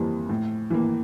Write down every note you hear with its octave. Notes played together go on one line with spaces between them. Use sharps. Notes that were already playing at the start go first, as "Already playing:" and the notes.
Already playing: F2 E3 G3 A#3
A2
E3 A#3